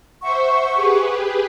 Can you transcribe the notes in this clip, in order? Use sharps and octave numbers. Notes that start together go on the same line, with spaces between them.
C5 E5 F#5 C#6
G4 G#4 B4